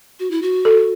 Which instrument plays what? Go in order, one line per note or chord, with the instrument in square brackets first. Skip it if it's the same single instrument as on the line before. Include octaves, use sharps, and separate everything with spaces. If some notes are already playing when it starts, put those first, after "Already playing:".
[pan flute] F#4
E4
F#4
[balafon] A4